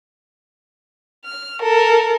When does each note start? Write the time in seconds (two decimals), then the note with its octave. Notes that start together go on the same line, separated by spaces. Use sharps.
1.25 F6
1.62 A4 A#4